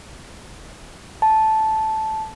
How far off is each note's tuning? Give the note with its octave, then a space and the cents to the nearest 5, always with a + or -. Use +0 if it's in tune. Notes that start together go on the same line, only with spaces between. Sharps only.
A5 -10